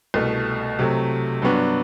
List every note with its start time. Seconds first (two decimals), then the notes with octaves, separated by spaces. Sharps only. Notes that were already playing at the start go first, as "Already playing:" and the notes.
0.14 C2 B2 A3
0.79 C3 F#3 A3
1.42 G2 F#3 B3 D4 F#4